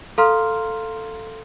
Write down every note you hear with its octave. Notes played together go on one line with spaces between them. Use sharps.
A4 F5 A#5 C6 F6